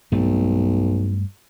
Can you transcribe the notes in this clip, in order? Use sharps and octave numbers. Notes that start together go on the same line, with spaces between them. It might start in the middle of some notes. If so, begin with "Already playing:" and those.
B1 G2 A3 C4